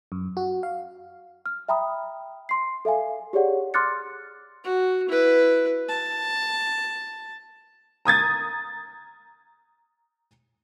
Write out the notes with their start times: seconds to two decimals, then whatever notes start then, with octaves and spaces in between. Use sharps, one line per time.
0.12 F#2
0.37 F#4
0.63 F5
1.46 F6
1.69 E5 G5 A#5 B5 D#6
2.49 C6 C7
2.85 A4 E5 F5 G#5
3.33 G4 G#4 C#5 D5 F#5
3.74 C6 D6 F6 F#6 A6 C#7
4.65 F#4
5.09 E4 B4
5.89 A5
8.05 A#5 D#6 G#6 A6